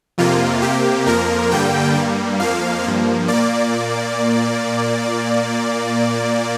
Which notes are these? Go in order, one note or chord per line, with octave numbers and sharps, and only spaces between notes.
F2 C3 A#3 F4
C3 A#3 G4
F2 F3 A#3 A#4
G2 D3 G3 A#3 G5
G2 G3 A#3
F2 F3 A#3 F5
G2 F3 A#3
A#2 A#3 D5